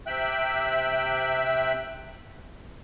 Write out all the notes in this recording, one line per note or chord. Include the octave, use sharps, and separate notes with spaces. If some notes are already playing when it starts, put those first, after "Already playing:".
C3 E5 G5 F#6